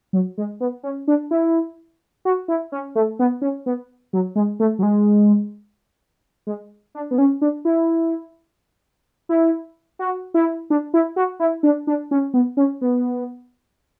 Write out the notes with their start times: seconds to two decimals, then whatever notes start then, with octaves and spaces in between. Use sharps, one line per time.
0.13 F#3
0.38 G#3
0.60 B3
0.83 C#4
1.08 D4
1.31 E4
2.25 F#4
2.48 E4
2.72 C#4
2.95 A3
3.19 B3
3.42 C#4
3.66 B3
4.13 F#3
4.36 G#3
4.60 A3
4.79 F#3
4.83 G#3
6.47 G#3
6.95 D4
7.11 B3
7.18 C#4
7.42 D4
7.65 E4
9.29 E4
9.99 F#4
10.34 E4
10.70 D4
10.94 E4
11.16 F#4
11.40 E4
11.63 D4
11.87 D4
12.11 C#4
12.34 B3
12.57 C#4
12.81 B3